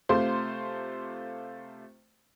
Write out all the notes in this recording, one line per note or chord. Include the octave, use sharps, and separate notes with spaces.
C3 A3 F4 C5 C6